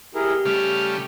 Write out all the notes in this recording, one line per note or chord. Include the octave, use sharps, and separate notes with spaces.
E4 G4 G#4 A#4
C#3 G3 A3 F6